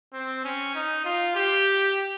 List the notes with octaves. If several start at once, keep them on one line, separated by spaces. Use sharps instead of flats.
C4
C#4
D#4
F4
G4